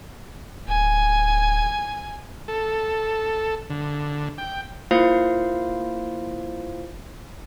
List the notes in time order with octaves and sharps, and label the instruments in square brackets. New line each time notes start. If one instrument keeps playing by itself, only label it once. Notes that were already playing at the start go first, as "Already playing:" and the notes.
[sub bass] D1 [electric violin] G#5
[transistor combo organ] A4
D3
G5
[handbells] A#3 E4 F4 C5 F5